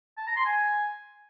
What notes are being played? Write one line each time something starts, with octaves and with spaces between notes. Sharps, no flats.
A5
A#5
C6
G#5